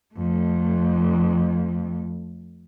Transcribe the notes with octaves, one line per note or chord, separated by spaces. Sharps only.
F2 A3